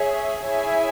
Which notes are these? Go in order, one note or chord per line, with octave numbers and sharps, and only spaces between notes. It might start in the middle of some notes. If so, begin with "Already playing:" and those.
Already playing: G#4 C#5 E5
E4 G#4 C#5 E5 G#5